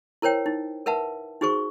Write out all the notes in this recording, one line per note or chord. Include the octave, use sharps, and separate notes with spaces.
E4 A#4 C5 C#5 G5
D#4
A#4 B4 E5 F#5 A5
D#4 F#4 G#4 C5 C#6